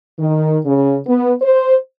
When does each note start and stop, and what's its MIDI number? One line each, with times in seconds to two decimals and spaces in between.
0.18 0.57 51
0.65 0.95 49
1.07 1.33 59
1.42 1.76 72